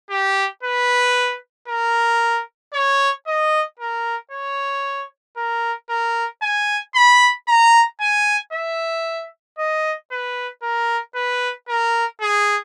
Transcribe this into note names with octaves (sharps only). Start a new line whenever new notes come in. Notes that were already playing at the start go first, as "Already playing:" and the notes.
G4
B4
A#4
C#5
D#5
A#4
C#5
A#4
A#4
G#5
B5
A#5
G#5
E5
D#5
B4
A#4
B4
A#4
G#4